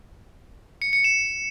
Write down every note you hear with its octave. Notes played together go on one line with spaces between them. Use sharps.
C#7
C#7
E7